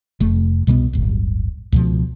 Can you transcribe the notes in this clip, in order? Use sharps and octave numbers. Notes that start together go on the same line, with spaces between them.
F1 A3
C2 B2 G#3 B3
D1 G1
C#2 B2 F3